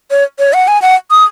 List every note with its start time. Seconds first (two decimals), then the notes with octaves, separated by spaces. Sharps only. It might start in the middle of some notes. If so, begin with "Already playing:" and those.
0.11 C#5
0.39 C#5
0.53 F#5
0.68 G#5
0.82 F#5
1.11 D#6